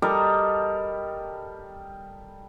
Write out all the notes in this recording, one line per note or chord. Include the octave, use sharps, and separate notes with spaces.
G3 A4 A#4 D#5